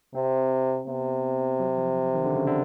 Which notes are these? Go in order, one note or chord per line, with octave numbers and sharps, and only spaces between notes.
C3 C4
C3 B3
F#3
F3
D#3
D3
C#3
D3